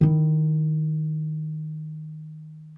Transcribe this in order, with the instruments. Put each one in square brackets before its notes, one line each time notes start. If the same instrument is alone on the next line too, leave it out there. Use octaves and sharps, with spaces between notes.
[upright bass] D#3 E4